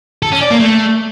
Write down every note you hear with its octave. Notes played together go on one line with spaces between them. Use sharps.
A4
C#4
D5
A#3
A3